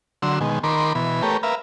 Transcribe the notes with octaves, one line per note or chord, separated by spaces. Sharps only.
D3 F#3 C6 E6
B2 D#3 G#3
D#3 A#4 B5 C6 D6
B2 E3 B5
A3 G4 A#4 B4 C#5
A#4 B4 E5 F5